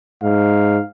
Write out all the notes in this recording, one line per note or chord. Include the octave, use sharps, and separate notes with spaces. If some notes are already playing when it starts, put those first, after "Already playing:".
G#2 F5